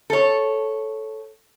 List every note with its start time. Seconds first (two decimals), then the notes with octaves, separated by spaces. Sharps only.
0.10 A4 C#5